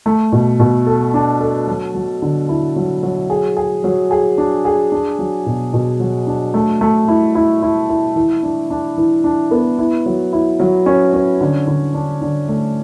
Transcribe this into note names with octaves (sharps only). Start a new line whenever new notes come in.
A3
B2
B2
A4
D4
A4
F#3
F#3
D3
E4
F#3
F#3
G#4
G#4
F#3
G#4
D4
G#4
D4
F#3
B2
B2
F#3
D4
A3
A3
E4
E4
E4
E4
E3
D4
D4
E3
D4
B3
E4
F#3
E4
F#3
C#4
C#4
D3
D3
D4
D3
A3